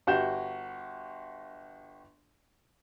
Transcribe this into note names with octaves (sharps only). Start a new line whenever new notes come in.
G1 F#4 G4 G6 E7